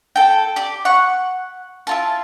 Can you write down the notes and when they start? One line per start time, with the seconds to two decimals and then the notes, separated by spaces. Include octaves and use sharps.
0.16 A4 G5
0.56 G4 D5
0.85 F#5 C#6
1.87 E4 F4 A5